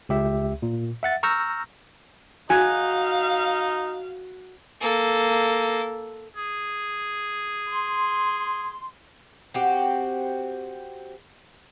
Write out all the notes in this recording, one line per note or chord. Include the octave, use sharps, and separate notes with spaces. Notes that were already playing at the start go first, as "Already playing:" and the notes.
C#2 G4 E5
A#2
E5 F#5 A6
A#5 C#6 E6 F6 G6 A#6
D#4 F#4 F5 G#5
A#3 A4
G#4
C6
C4 F#4 G4